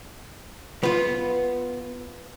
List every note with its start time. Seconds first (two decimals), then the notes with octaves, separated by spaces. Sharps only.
0.83 B3 F4